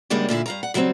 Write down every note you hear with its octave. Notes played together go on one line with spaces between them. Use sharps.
F#2 C#3 G3 G#3 A#3 D4
A#2 D3 E4 F5
G2 F5 A#5
F#5
C#3 F#3 G3 A3 C4